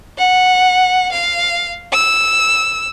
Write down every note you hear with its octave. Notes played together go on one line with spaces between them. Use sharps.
F#5
F5
E6